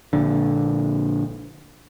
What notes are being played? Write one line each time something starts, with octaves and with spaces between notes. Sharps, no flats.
A#1 D3